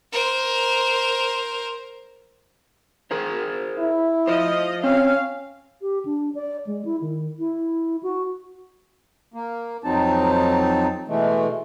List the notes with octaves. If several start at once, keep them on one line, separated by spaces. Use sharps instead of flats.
A#4 C5
G#4 A#4 C5
E4
F4 C5 D#5
C4 C#4 F5
G4
D4
D5
G#3
E4
D#3
E4
F#4
A#3
F2 F#3 C4 D#4 A5
B2 E3 G#3 A3